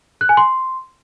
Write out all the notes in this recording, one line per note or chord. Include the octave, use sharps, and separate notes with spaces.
F#6
G#5
C6